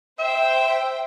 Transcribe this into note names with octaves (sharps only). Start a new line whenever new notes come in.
C5 E5 G5